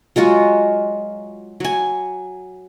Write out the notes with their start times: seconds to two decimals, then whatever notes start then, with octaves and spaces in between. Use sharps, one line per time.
0.16 F#3 G#3 F4 F#4
1.60 F#3 G#5